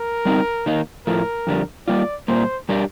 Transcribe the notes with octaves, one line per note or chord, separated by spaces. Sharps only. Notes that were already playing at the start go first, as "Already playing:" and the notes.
Already playing: A#4
G3 C4 D#4
D#3 A#3 D#4
A2 F3 A3 A#4
F2 D3 G3
G3 A#3 F4 D5
A#2 G3 A#3 C5
G3 D4 G4 A#4